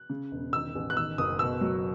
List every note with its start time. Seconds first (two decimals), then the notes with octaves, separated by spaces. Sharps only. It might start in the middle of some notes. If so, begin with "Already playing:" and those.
Already playing: F#6
0.10 C#3
0.31 E1
0.53 D#3 E6
0.75 A1
0.90 F#6
0.97 D#3 E6
1.18 F#1 D#6
1.39 B2 E6
1.61 F#3